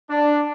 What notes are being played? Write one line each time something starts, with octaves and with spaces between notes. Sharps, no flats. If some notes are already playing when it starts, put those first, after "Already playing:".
D4